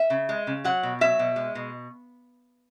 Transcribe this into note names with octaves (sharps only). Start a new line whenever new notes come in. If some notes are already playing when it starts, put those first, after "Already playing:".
Already playing: E5
C#3
G#3
C#3
F#3 F#5
B2
F#3 E5
B2
G#3
B2